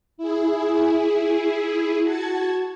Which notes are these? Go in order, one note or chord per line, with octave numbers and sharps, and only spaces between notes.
E4 G#4
F#4 A5 G#6